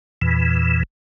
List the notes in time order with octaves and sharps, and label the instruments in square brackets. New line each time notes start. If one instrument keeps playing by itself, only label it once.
[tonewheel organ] E2 A#2 E3